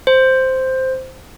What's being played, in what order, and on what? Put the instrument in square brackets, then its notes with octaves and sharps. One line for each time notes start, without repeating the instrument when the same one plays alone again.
[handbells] C5